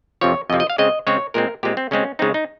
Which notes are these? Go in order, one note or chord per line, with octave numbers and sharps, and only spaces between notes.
F2 C3 F3 C#5
F2 C3 F3 D#5
D#5
F5
C#3 G#3 C4 D#5
C#3 G#3 C4 C#5
A#2 G#3 C4 A#4
A#2 G#3 C4 G4
C4
C#3 G#3 C4 C#4
C#3 G#3 C4 D#4
D#4